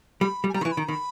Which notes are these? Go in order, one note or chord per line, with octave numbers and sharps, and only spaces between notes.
G3 B5
G3
G#5
G3 A#5
D#3 E3 C#6
B5
D#3 A#5
D#3 B5